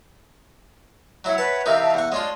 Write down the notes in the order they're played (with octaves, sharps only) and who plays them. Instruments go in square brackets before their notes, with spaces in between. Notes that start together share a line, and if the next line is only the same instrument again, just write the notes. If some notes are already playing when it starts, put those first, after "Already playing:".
[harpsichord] F#3 E4 [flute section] C#5 E5 F#5
[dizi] B4 [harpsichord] A5
[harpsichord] C3 E3 D#4 [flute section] G4 F5 A#5 [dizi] A#4
[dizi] A5
[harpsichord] E2 C#6 [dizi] F#5
[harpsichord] G#3 D4 F4 [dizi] C#5 [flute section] D5 A5 C6